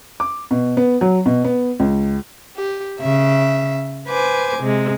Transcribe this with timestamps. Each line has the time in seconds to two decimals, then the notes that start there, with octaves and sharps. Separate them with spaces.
0.20 D6
0.51 B2
0.77 B3
1.01 F#3
1.26 B2
1.44 B3
1.80 C#2
2.55 G4
3.00 C#3 E5
4.08 B4 C5 G#5 D6
4.60 C3 G#3